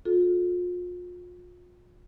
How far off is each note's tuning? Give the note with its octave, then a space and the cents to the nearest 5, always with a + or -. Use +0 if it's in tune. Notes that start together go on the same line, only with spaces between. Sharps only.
F4 +35 A4 -15